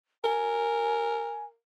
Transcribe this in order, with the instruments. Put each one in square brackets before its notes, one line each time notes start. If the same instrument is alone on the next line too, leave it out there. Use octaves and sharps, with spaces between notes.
[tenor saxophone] A#4 [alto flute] G#5